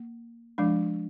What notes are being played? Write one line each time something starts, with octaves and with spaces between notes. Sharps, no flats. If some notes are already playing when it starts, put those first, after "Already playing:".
Already playing: A#3
F3 G#3 D4